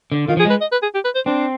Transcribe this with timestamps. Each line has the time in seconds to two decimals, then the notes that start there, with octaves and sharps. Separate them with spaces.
0.12 D3
0.28 D#3 F4
0.37 F3
0.39 G#4
0.45 G#3
0.50 B4
0.61 D#5
0.72 B4
0.83 G#4
0.94 G4
1.05 B4
1.15 C5
1.26 C4 D4